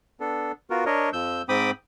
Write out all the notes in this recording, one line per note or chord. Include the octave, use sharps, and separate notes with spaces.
B3 D4 A4
B3 F4 F#4 A#4
D4 A#4 C#5 D#5
F2 F3 E6 G6
G#2 C4 G5 B5 D6 D#6